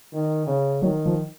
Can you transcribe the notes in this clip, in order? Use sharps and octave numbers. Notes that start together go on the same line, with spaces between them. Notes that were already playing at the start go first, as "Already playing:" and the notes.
D#3
C#3
D#3 F#3
F3